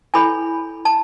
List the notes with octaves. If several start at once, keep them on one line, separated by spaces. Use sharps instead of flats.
E4 A4 C#5 G#5 B5
A5